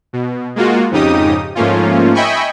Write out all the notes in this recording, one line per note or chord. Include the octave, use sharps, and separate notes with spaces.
B2
G#3 A#3 F4 F#4
F2 G#2 C#3 D#4 G4 D#6
G#2 F3 A3 A#3 C#4 F4
D#5 E5 G5 G#5 B5 C#6